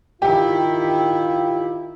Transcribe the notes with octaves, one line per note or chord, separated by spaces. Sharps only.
D#3 E4 F4 G4